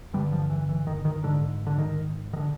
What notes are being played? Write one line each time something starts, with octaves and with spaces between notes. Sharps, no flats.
G2 D3 G3
F3
E3
E3
D#3
D#3
G#2 D3
D3
D#3
D#3
D3